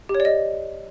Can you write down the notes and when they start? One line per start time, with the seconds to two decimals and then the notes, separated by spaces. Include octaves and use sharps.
0.09 G4
0.15 C#5
0.20 D5
0.25 D#5